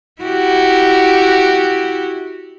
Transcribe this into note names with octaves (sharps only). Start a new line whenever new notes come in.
E4 F#4 G4